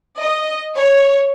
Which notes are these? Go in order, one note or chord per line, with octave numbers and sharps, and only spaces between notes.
D#5
C#5